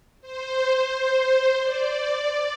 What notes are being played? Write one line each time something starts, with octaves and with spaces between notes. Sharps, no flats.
C5
D5